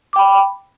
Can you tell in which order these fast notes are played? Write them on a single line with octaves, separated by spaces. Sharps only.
D6 G5 B5